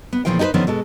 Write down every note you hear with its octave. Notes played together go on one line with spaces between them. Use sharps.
B3
A#2 C#3 E3 F3 F5 G5
D#4 F4 A4 B4 C5
D3 D#3 F3 B3 C#4
B2 G#3 A4